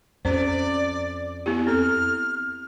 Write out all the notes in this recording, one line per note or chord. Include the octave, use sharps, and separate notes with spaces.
F2 C#4 C5 D5
B3 E4 G4
C4 A4 F6